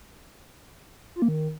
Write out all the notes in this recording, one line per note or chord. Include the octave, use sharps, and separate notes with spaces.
F4
A#3
D#3